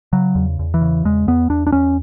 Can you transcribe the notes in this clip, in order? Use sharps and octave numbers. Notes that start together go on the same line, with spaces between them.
C#3 F#3
E2
E2
E3
C#3
E2 G#3
E2 B3
E2 D4
D4
E2 C#4